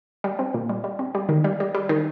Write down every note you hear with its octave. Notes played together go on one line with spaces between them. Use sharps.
G3
C4
A#2
G3
G3
C4
G3
D#3
G3
G3
G3
D#3